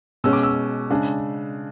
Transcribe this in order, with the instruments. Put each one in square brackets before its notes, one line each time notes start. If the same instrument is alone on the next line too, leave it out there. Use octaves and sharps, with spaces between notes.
[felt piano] B2 G#3 C#4 E6
D6
E6
C#3 G#3 D4